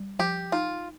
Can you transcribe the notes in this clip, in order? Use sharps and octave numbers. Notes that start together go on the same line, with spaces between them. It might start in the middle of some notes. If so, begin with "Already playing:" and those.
Already playing: G3
F3 G4
D#4 F4